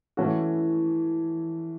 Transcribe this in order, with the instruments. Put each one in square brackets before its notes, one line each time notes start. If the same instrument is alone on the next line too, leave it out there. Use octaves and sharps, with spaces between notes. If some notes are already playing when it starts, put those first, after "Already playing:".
[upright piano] E3 A3 C#4 F#4